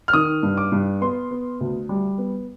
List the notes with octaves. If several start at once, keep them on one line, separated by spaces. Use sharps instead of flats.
F6
D#3 D#6
G2
D6
G2
B3 C6
B3
D2
G3
B3